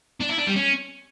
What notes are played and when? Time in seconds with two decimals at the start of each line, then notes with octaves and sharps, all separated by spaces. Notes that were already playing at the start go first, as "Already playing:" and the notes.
0.20 D4
0.29 E4
0.38 D4
0.47 G3
0.56 C#4